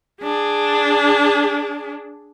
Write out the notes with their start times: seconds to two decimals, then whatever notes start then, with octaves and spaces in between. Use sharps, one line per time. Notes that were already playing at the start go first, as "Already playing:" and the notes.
0.22 D4 G#4